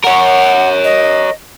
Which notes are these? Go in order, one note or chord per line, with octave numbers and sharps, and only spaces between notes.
A#4 C#5 F#5
D#5